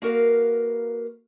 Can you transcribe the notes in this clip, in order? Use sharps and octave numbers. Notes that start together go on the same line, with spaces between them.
A#3 F#4 A#4 B4 F5